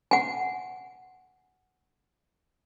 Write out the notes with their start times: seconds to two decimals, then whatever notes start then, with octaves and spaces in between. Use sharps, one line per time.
0.11 F#5 G#5